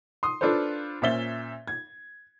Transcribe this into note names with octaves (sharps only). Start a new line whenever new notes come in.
C6 D#6
D4 F4 A4 B4 C5
A#2 C#4 C5 E5 A6 G7
G#6